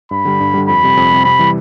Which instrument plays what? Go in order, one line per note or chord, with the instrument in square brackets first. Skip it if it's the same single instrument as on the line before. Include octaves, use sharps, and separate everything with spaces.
[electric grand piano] G2 [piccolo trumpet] B5
[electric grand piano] D3 G3
G2
D3 G3
[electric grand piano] F2 [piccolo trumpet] B5
[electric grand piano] C3 G3
F2
C3 G3
[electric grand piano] C3 [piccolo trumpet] B5
[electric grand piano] E3 G3